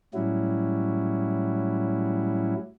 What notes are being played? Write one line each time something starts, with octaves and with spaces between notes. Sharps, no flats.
A2 F#3 G3 C#4 E4 F#4